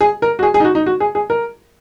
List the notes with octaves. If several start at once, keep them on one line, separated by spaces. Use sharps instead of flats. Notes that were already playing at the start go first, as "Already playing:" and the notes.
G#4
A#4
F#4
G#4
G#4
D#4
F#4
D#4
F#4
G#4
G#4
A#4